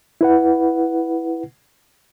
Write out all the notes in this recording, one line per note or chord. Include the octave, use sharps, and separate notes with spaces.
E4 B4 F#5